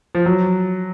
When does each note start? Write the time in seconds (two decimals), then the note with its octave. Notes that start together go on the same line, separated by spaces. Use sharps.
0.15 F3
0.26 F#3